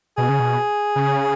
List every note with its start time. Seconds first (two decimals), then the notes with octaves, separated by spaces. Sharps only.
0.17 B2 G#4
0.29 C#3
0.40 B2
0.96 C#3